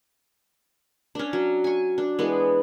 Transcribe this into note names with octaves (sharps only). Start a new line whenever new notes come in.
C#4 D4
F#3
G#5 C#6
D4
E3 G#3 B3